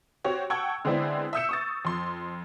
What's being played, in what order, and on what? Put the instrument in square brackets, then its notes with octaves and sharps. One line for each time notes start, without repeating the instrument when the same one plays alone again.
[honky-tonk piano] C4 F#4 G4 C#5
F#5 G5 A5 C#6 E6 G#6
D3 G#3 B3 C4 D4 E4
E5 D#6 E6 G6 C#7 E7
C#6 D#6 A6
F2 C6